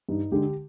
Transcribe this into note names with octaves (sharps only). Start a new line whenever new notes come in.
G2 D#4
D3 G#3 G4